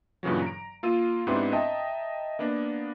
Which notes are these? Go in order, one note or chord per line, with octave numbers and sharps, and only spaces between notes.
G2 A#2 C#3 E3 F#3
A#5 D7
A#3 F4 E6 D#7
G#2 B3 C4 D4 E4 G4
D#5 E5 G5 A5 A#5 D#6
A#3 B3 D4